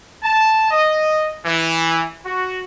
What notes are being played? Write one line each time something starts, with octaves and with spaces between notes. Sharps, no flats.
A5
D#5
E3
F#4